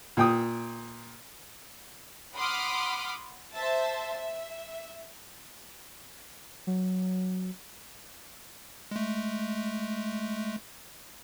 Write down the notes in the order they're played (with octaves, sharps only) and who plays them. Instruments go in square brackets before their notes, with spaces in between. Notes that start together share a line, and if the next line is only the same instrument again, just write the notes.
[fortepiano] A#2 G5 D#6
[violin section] F#5 B5 C6 D6 D#6 F6
C5 E5 A5
E5
[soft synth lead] F#3
[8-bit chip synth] G#3 A3